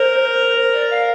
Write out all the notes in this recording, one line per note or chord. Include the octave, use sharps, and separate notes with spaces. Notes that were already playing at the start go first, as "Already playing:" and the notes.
Already playing: A#4 C5
D5
F5